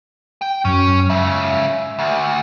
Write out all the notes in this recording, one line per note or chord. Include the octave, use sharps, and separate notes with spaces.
G5
F#2 C#4
G#2 C#3 E5
D2